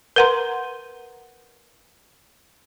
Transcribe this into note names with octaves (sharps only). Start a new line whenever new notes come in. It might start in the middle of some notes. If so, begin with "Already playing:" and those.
A#4 B4 F#5 A#5 C6